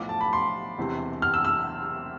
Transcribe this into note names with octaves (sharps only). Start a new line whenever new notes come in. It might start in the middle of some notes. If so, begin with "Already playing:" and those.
Already playing: B1 A2 F3 D6
A5
B5
C6
E1 E2 C3 E3
F6
E6
E6